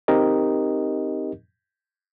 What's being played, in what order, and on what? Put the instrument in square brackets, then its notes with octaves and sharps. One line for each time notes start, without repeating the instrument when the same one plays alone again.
[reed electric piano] C4 D#4 G4 A#4 D#5